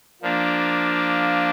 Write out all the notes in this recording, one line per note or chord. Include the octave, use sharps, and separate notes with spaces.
F3 A#3 D4 F4